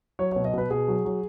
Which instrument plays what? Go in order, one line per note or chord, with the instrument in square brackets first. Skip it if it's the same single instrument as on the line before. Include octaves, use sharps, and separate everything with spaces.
[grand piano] F#3 C#5
C#5
B2
D#5
B2 B4
B2 G#4
F#3
F#3